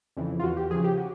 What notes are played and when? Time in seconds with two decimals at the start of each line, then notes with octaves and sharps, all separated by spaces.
0.17 F2 C#3 E3
0.40 F4
0.43 E2 F#4
0.57 G4
0.71 C#3 F3 G#4
0.84 G4
0.98 F#4